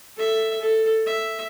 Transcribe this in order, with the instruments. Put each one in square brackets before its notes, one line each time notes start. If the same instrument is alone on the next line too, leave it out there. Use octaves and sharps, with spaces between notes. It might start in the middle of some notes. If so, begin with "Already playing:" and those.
[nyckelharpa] A4 E5
A4
E5